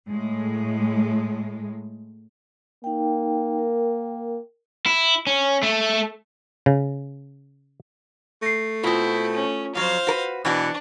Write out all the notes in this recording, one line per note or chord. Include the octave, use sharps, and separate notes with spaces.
A2 G#3
A#3 D#4 G5
A#4 G5
E4
C#4
A3
C#3
A3 A#6 C7
B2 C4 E4 F4 D#6
C#4
F2 F#3 C5 F5
F#4 A#4 B4
B2 E3 D4 F#4